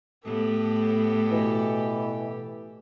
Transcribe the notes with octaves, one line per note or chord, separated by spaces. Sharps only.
A2 B3 G4 A4
B2 E3